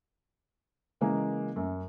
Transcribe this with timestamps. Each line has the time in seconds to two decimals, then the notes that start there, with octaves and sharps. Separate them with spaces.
1.01 C#3 E3 G#3 A#3
1.56 F#2